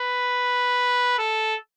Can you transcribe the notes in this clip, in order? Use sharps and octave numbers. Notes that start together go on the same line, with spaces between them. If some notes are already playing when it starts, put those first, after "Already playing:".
Already playing: B4
A4